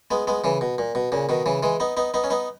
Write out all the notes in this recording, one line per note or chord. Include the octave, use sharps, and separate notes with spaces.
G#3 B3
G#3 B3
C#3 E3
B2
A#2
B2
A#2 C#3
B2 D#3
C#3 E3
E3 G#3
B3 D#4
B3 D#4
B3 D#4
C#4
B3 D#4